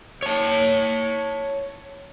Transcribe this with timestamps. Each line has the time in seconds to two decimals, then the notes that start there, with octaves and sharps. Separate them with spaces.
0.23 C#5 A5